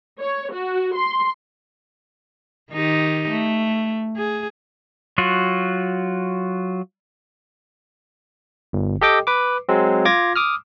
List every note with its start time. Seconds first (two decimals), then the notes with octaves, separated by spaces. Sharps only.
0.20 C#5
0.52 F#4
0.96 C6
2.72 D#3 D#4 G4
3.30 A3
4.17 G#4
5.18 F#3 F4 F#4
8.73 G1
9.01 G4 A4 D#5 G5 D6
9.27 B4 D6
9.69 F#3 G#3 C4
10.05 F4 D6 G#6 A#6
10.36 D6 D#6 F6